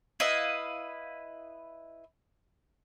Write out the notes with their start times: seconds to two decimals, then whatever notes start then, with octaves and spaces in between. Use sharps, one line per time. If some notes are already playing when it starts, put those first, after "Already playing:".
0.20 E4 B4 D#5 F5